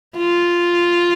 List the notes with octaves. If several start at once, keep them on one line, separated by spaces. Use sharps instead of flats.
F4